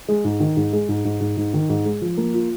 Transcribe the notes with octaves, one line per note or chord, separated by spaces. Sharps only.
G#3
G#2
D#3
G#2
G#3
G#2
G#2
G#2
G#2
D#3
G#2
G#3
F3
A#3
F4